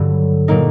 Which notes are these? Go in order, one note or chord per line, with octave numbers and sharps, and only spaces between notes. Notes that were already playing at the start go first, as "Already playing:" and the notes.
Already playing: G2 D3 F#3
A#2 F#3 A#3 D#4